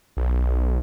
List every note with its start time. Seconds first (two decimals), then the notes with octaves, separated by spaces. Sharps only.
0.17 B1